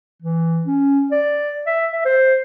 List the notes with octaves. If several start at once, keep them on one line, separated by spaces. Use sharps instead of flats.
E3
C#4
D5
E5
E5
C5